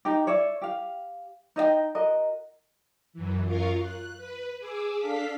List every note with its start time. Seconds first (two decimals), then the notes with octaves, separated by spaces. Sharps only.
0.05 D#4 G4
0.27 C#5 D5 E5
0.61 G4 F5
1.56 D#4 D#5 E5 G5
1.95 F#4 A#4 D#5
3.13 F#2 E3
3.44 F#2 F4 A#4 F5 C#6
3.80 F#6
4.17 B4
4.59 G#4 D6 E6
4.98 D4 A4 F5 B6